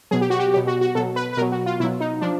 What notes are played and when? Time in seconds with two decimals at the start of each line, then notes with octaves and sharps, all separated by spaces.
0.11 B2 F#3 G#4
0.21 G4
0.30 F#4
0.39 G4
0.54 B2 F#3 G4
0.67 F#4
0.81 F#4
0.95 B2 F#3 A4
1.16 B4
1.33 B4
1.37 B2 A#4
1.41 F#3
1.52 F#4
1.66 F4
1.80 B2 F#3 E4
2.00 D#4
2.21 F3 D4